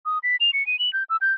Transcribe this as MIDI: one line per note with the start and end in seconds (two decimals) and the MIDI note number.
0.06 0.19 87
0.23 0.36 95
0.40 0.51 101
0.53 0.65 97
0.67 0.79 99
0.79 0.92 102
0.93 1.04 91
1.10 1.17 88
1.21 1.33 91